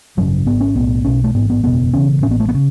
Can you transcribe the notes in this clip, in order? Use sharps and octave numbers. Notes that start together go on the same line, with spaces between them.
G#1 F#2 C#3 F#3
G#1 G#2 B3
C#4
B1 A2 B3
B1 B2 C#4
A3
A1 G#2 B3
B3
F#1 E2 B2 B3
E1 E2 C#3 C#4
A1 A2 B3 C#4
A3
B3
C#3